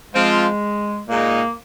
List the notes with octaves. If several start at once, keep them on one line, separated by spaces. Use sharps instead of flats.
F3 G#3 C4 F4
A#2 G#3 A#3 D#4